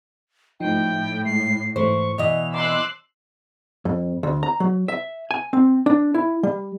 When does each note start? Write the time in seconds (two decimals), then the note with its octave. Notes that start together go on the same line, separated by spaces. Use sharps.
0.60 A2 F3 D#4 G5
1.25 G#3 C7
1.76 G#2 E3 A3 C5 C#6
2.18 B2 E3 D5 D#5 F7
2.53 C6 D6 E6 F#6
3.85 F2
4.23 D2
4.43 A#5
4.60 F#3
4.88 E5
5.31 G#5
5.53 C4
5.86 D4
6.14 E4
6.43 G3